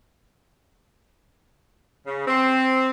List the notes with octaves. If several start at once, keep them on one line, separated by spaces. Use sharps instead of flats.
C#3
C4